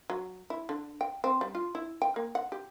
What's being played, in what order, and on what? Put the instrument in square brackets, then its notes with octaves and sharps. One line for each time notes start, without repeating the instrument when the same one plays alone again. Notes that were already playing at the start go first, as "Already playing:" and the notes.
[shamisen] F#3
E4
D3
G5
C4
G3
F4
E4
G5
A#3
F#5
G4